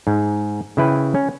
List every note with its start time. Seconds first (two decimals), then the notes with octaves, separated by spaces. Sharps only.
0.07 G#2
0.77 C#3 E4 B4 G5
1.15 C#4